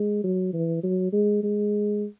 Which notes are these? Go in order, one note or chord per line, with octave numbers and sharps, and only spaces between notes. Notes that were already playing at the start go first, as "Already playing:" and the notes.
Already playing: G#3
F#3
E3
F#3
G#3
G#3